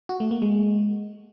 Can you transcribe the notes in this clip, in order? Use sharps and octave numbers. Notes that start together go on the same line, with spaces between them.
F#4
A3
A#3
G#3